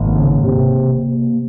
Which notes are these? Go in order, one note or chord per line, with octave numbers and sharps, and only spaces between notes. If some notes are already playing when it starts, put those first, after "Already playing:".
Already playing: G#1 A#3
C#3
C3